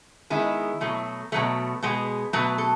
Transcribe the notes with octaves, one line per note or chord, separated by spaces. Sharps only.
D#3 G#3 B3 E4
B2 F#3 A3
B2 F#3 A3 B4
B2 G#3 B3
B2 F#3 A3 B4
A4